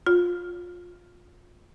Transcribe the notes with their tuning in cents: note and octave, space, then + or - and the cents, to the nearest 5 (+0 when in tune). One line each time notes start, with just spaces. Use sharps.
F4 +20